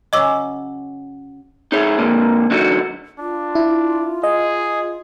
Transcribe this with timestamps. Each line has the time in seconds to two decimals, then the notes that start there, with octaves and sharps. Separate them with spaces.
0.13 C#3 F#3 C#4 D#5 D6 E6
1.72 D#4 E4 G#4 C#5
1.99 A#2 D3 A#3
2.51 D3 F#3 D#4 F#4
3.19 D4 F4
3.55 E4
4.23 G#4 D#5